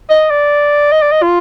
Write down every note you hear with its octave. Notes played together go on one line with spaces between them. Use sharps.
D#5
D5
D#5
D5
D#5
F4